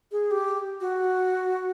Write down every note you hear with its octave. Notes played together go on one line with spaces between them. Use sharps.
G#4
G4
F#4